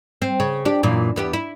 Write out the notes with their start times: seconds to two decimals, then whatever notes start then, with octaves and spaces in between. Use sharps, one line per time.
0.22 C4
0.40 C#3
0.65 D4 G4
0.83 F#2 A#2 E3
1.16 E2 B3 G4
1.33 E4